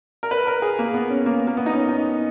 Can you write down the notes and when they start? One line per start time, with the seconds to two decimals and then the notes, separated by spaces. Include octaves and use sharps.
0.23 A#4
0.31 B4
0.47 A#4
0.62 G#4
0.79 A#3
0.94 B3
1.10 C#4
1.26 A#3
1.47 A#3
1.57 B3
1.66 D#4
1.73 C#4
1.89 D#4